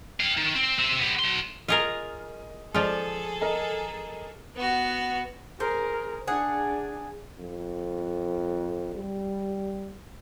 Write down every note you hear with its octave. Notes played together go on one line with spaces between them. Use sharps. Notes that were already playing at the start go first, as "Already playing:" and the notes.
F5 G5
D#3
C4
C4 E5
B3 G4
F#3 C6
F4 G#4 A#4 D#5
F3 G#3 F4 G#4 A4 D5
A#4 D#5 A5
B3 F#4
G#4 A#4 C5
D4 G#4 F#5
F2
G3